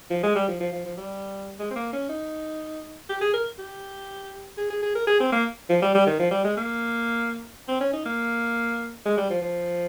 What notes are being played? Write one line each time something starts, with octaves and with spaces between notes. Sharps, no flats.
F3
G#3
G3
F3
F3
F3
F3
G3
G#3
C4
A#3
C#4
D#4
G4
G#4
A#4
G4
G#4
G#4
G#4
A#4
G#4
C4
A#3
F3
G3
G3
D#3
F3
G3
G#3
A#3
C4
C#4
D#4
A#3
G#3
G3
F3
F3